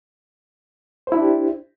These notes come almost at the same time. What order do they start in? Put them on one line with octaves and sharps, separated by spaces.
C5 E4 D4 G4